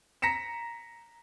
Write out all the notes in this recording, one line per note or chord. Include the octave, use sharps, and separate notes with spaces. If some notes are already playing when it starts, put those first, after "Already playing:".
A#5 A#6 B6 C#7 E7